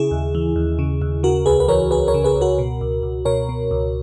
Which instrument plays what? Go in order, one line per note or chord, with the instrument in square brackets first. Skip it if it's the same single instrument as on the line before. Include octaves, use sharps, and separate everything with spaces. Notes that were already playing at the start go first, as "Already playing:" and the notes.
Already playing: [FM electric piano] C#3 E4 G#4
D#2
E3
D#2
C#3
D#2
C#3 F#4 A#4
C#2 G#4 B4
B4
E3 A#4 C#5
C#2 G#4 B4
A#4 C#5
C#3
G#4 B4
C#2
F#4 A#4
B2
C#2
C#2
B2 A#4 C#5
B2
C#2